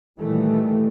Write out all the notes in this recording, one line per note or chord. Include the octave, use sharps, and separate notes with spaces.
A#2 D#3 E3 G3 A3